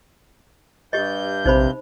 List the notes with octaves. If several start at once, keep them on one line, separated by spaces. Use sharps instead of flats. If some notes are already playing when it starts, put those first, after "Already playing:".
G2 G4 D#5 G6
A#1 C3 D#4 C5 B5